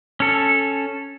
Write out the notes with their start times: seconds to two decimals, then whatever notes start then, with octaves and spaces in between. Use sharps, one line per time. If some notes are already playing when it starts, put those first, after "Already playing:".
0.20 C#4 A4